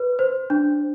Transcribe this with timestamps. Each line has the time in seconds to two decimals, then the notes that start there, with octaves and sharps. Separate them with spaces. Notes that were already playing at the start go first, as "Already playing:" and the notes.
Already playing: B4
0.19 C5
0.50 D4